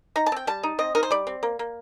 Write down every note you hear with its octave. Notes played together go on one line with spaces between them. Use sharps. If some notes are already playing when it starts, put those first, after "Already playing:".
D#4 A#5
A5
C4 G5
G3 A5
D#4
C4 D#5
D#4 A#4
C5
G3 D5
C4
A#3
A#3